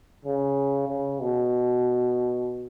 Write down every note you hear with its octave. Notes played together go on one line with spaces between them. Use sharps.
C#3
C#3
B2